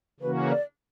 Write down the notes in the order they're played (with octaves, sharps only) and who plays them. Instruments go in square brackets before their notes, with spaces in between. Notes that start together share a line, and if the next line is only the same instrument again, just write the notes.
[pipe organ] C#3 E3 A#3 C#4 F#4 [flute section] B4
[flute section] D5